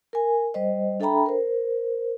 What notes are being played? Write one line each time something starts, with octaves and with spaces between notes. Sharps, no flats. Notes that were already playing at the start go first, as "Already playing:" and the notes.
A#4 G#5
G3 C5 D#5
D4 A4 E5 G5 A#5 B5
A#4 C5